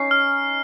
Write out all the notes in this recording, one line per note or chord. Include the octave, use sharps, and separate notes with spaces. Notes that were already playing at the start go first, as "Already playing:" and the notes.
Already playing: C#4 D#4 C7
F6